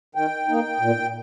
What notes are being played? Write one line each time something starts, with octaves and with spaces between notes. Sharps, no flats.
D#3 G5
A#3 D#4
A#2